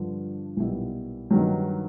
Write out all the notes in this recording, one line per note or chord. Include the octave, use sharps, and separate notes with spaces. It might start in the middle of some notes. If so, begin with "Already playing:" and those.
Already playing: G2 D3 F3
B1 A#2 G3 B3 E4
G2 D#3 F#3